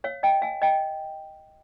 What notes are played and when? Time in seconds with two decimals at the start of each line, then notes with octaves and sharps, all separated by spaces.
0.04 C#5 F5
0.23 D#5 G5
0.42 F5 G#5
0.62 D#5 G5